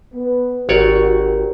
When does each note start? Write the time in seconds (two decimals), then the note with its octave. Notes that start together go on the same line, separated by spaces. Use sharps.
0.14 B3
0.69 G#1 F#4 G4 A#4 C#5 D5